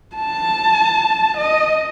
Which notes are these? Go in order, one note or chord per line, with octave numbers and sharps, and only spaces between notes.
A5
D#5